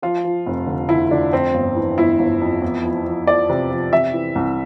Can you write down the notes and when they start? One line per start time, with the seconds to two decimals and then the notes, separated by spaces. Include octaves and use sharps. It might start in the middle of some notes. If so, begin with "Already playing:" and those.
0.02 F3 F4
0.24 F3
0.46 F1
0.67 D3
0.89 D3 E4
1.11 D3 D4
1.32 F2 C4
1.54 G1
1.76 E3
1.98 G1 E4
2.19 G1
2.41 F2
2.62 E2
2.83 F3
3.05 F3
3.27 F3 D5
3.49 C3
3.71 F3
3.93 C3 E5
4.13 E3
4.35 C2